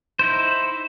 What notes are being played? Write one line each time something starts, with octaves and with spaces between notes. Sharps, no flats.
D#4 E4 C5